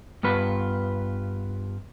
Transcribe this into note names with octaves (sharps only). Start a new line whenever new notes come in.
G2 B3 F4 B4